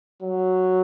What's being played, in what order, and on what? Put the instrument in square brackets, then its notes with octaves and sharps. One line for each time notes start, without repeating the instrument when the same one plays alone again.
[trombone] F#3